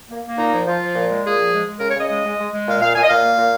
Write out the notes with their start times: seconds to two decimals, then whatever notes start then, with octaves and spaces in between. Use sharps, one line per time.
0.09 A#3
0.22 A#3
0.37 A#2 D#4
0.52 F3
0.66 F3 F4
0.80 F3
0.95 A#2
1.08 G#3
1.23 A#2 G#4
1.36 F3
1.51 G#3
1.65 G#3
1.79 C#3 A#4
1.89 C#5
1.94 C#3 D#5
2.08 G#3 D#5
2.23 G#3
2.38 G#3
2.51 G#3
2.66 A#2 F5
2.80 A#2 F5
2.94 A#2 G#5
3.02 D#5
3.08 A#2 F5
3.23 A#3
3.37 A#2